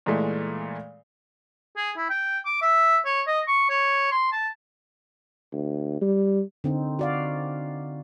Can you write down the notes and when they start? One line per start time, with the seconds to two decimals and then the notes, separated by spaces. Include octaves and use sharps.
0.06 A#2 E3 G#3 A3
1.77 G#4
1.97 E4
2.10 G5
2.46 D6
2.62 E5
3.06 C#5
3.27 D#5
3.48 C#6
3.70 C#5
4.11 C6
4.32 A5
5.53 D2
6.01 G3
6.64 D3 C4 D#4
6.99 F#4 D5 F5